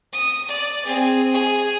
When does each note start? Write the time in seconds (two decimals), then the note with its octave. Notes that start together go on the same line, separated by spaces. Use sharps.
0.13 D#6
0.49 D5
0.85 C4 G#4
1.34 G#4